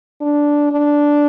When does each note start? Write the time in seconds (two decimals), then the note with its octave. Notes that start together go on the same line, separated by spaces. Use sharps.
0.21 D4
0.71 D4